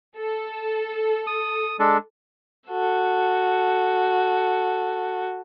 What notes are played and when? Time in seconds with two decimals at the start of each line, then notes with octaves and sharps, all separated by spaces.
0.19 A4
1.27 D#6
1.79 G#3 D4 A4
2.68 F#4 A4